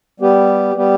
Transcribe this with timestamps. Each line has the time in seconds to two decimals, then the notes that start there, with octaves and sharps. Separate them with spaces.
0.20 G3 B3 G4
0.75 G3 B3 G4